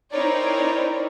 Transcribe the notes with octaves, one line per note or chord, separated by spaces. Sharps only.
C4 D#4 E4 A#4 C#5 D5